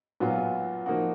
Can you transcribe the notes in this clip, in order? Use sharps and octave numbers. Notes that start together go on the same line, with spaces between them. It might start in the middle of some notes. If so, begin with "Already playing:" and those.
A#2 F#3 B3 F4
F3 A#3 D#4 F#4